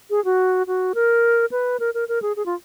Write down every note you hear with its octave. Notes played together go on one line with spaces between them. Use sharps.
G#4
F#4
F#4
A#4
B4
A#4
A#4
A#4
G#4
G#4
F4